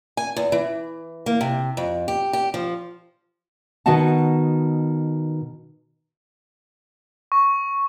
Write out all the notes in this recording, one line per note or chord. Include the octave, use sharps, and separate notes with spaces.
G#5
E2
E3
A#3
C3
F2
G4
G4
F3
B2 D#3 F#4 D#5 F#5 A5
C#6